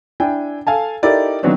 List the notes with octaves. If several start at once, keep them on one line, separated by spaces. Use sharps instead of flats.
D4 E4 G5 G#5
A4 F5 G#5 A5
D#4 E4 G4 A4 A#4 D5
D#3 E3 F#3 B3 C4 D4